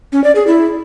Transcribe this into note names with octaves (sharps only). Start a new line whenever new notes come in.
C#4
D5
G#4
E4